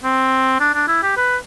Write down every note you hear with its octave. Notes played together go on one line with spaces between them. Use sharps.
C4
D4
D4
E4
G4
B4